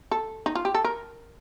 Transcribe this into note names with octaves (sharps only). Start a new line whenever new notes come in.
A4
D#4
F4
G4
A4
A#4